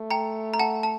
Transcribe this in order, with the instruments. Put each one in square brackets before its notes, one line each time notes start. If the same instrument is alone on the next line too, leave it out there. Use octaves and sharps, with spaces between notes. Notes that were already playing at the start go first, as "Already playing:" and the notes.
Already playing: [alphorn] A3
[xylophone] G5 A#5
A#5
F#5 A5
A5